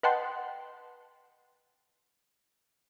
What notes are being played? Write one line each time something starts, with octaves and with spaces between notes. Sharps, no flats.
B4 D#5 F#5 G5 A5 C6